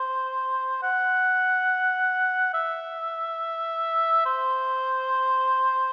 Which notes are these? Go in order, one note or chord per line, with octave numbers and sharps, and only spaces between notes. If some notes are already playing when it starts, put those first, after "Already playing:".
Already playing: C5
F#5
E5
C5